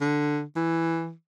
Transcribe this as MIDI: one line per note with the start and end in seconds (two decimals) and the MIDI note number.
0.01 0.42 50
0.56 1.12 52